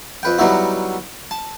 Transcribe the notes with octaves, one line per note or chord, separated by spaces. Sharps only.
F2 B4 G5
F#3 G3 B3 D#4 E4 F#4
A5